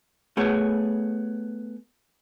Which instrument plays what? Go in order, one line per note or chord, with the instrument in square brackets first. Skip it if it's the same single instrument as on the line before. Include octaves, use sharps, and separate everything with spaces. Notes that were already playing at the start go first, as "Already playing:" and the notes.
[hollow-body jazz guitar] A3 B3 G#4 C#5